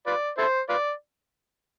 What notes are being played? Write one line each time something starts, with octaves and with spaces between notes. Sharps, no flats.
F4 B4 D5
E4 A4 C5
F4 B4 D5